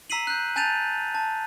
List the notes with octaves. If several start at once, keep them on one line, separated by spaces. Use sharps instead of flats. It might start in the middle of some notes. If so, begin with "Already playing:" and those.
A#5 E6 B6 C7 D#7 F#7
F#6 G6
G#5 A5 G6 A6 D#7 F7
A5